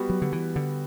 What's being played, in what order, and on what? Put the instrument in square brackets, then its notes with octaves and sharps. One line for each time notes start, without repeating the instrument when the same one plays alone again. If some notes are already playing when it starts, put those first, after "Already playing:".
Already playing: [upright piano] G3 B3 F#4
[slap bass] F#3
D3
E3
D3